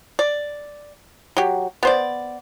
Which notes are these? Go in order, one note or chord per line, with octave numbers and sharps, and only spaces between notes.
D5
F#3 G4
B3 C5 D5